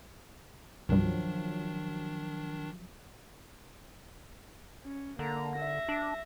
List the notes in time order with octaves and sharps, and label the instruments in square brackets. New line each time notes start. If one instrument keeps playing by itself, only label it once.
[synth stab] C2 G2 [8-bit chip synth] D#3 D4 [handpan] F3 F#3
[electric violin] C#4
[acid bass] D3 [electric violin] A#3 A#5
[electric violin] E5 A#6
[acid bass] D4